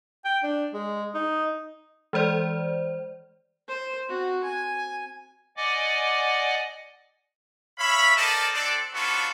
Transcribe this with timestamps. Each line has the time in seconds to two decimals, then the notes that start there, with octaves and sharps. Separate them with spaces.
0.25 G5
0.43 D4
0.73 G#3
1.15 D#4
2.13 E3 G#3 C5 D5
3.68 C5
4.09 C4 F#4
4.44 G#5
5.57 D5 D#5 F#5 G#5 D6
7.79 C#5 E5 F5 B5
8.16 C4 A4 A#4 D5 D#5 A5
8.53 C4 D4 A4 D5
8.93 B3 C#4 D4 F4 F#4 A4